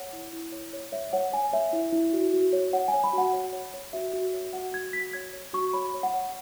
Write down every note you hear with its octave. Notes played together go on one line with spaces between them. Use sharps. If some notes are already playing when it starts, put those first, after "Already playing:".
Already playing: C#5 F#5
E4
E4
C#5
C#5
C#5 E5
C#5 F#5
C#5 G#5
C#5 E5
E4
E4
F#4
F#4
C#5
C#5 F#5
G#5
C#5
B5
F#4 F#5
C#5
C#5
C#5
F#4 E5
F#4
C#5
F#4 F#5
F#4 G#6
F#4 B6
C#5 G#6
C#5
F#4 C#6
C#5 B5
C#5
F#5
C#5